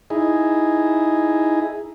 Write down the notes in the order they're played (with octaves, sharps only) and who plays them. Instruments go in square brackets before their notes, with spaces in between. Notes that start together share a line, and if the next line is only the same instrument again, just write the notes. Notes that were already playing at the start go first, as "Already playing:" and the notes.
[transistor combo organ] D#4 E4 G#4